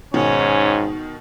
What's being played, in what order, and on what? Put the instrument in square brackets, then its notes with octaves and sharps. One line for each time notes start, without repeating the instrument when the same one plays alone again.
[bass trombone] G#2 [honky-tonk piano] B2 D#3 [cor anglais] C#4